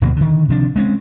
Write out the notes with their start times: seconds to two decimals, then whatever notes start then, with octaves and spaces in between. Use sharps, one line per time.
0.02 D2 B2 F3 A#3
0.16 D3 D#3
0.49 C3 F3 D4
0.76 G#3 C4 C#4